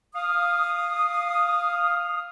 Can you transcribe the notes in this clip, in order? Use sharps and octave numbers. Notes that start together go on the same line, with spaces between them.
F5 D#6